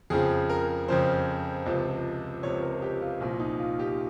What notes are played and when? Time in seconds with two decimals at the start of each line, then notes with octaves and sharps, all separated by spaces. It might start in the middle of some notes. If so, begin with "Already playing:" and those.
0.10 F2 C#3 F3 G#4
0.50 A#4
0.88 F2 C#3 F3 C5
1.66 C#2 C3 F3
2.43 C#2 C3 F3 C#5
2.62 A#4
2.82 G4
3.02 F4
3.20 C2 A#2 F3
3.40 D#4
3.59 F4
3.79 G4